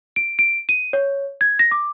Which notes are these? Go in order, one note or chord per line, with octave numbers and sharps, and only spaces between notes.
D7
D7
D#7
C#5
G#6
A#6
D6